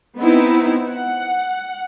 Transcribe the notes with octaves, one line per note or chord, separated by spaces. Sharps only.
B3 C4 D#4 E4
F#5